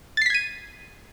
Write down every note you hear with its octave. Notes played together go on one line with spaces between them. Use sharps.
G#6 A6 B6 C7 D#7